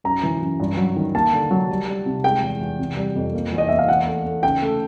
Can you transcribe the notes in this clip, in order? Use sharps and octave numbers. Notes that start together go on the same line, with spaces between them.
F#2 A#5
E3
F#2
G2
F#3
D#3
A#3 A5
D3
F#3
G3
G3
C3
G#3 G5
E2
E2
C3
G3
F2
A#3
E2
D#5
A#3 E5
F5
E2 F#5
A3
A3
C#3 G5
A3